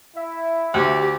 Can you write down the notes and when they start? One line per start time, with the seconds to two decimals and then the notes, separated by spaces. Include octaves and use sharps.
0.16 E4 E5
0.74 D2 G4